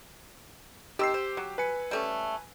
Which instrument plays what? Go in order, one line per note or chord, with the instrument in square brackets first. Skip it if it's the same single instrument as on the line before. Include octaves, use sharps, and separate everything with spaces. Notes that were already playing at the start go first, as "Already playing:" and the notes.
[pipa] D#3 C4 [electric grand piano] G4 E6 C7
[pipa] C5
F#3
[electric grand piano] B4 G#5 C#7
[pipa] G3 A3 C#4